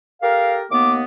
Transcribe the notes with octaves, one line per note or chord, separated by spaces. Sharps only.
G4 A4 A#4 F5
D#2 A#3 B3 D6